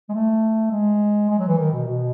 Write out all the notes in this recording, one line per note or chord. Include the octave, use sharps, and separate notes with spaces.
G#3
A3
G#3
G#3
F#3
E3
D#3
B2
B2